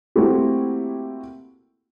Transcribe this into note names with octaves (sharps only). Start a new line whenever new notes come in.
A3 A#3 C4 E4 F#4 G4